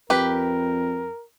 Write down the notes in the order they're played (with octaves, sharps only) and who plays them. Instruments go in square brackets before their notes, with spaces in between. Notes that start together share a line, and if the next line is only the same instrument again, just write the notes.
[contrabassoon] F2 [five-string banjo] G4 B4 [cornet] A#4